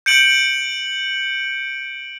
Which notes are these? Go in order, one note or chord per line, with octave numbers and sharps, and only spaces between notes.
G6 C#7 D7 F#7